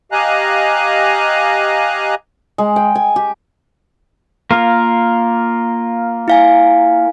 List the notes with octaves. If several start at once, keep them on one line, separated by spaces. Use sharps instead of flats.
G4 D#5 F5 G#5 A#5 F#6
G#3
G5
G#5
G4
A#3 F4 A#4
E4 F5 G#5